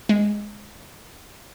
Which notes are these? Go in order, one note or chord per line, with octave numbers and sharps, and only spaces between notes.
G#3